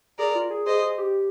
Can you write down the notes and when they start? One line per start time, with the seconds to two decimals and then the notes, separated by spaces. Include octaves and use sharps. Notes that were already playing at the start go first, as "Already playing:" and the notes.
0.18 G#4 A#4 D5
0.35 F4
0.50 G#4
0.66 G#4 C5 D#5
0.82 G#4
0.98 G4